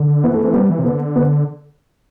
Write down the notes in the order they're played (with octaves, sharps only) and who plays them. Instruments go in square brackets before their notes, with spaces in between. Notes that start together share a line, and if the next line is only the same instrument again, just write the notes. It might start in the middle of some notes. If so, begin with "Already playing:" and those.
Already playing: [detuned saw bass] D3
[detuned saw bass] E3 [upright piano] B3
[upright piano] A3
A3 C4
[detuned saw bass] G3 [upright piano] B3
[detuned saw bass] E3
C3
[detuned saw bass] D3 [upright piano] B3
[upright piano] B3